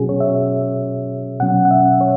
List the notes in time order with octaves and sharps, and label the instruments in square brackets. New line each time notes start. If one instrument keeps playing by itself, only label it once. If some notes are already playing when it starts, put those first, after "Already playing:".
Already playing: [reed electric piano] B2 F#3 C#4 F#4 G#4
C#5
E5
B2 F#3 C#4 F#5
F#5
E5
C#5